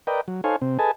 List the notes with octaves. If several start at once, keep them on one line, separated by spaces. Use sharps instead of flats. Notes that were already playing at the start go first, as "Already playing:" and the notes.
A#4 B4 D5 D#5 G5
F#3
D#4 A4 C5 C#5 F5 G#5
C3 C4
G#4 A4 B4 D#5 G#5 A5